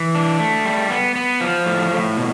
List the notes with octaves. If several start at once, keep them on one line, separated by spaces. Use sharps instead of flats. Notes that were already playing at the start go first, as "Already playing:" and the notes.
Already playing: E3
D4
A3
G3
B3
B3
F3
A2
A2
B2